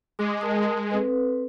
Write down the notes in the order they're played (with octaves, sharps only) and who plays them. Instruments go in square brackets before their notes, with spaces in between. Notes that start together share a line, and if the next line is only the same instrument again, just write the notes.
[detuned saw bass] G#3 [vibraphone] D6
[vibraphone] A#4 A5 D#6
C4 A4 B4